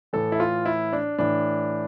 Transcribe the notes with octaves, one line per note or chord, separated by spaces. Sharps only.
A2 E3 A4
E4
F4
E4
D4
A2 E3 D4